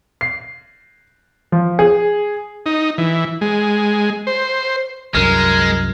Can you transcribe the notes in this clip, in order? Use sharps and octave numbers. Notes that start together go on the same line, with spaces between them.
C7
F3
G#4
D#4
E3
G#3
C5
C2 F#2 G#3 A#4 F6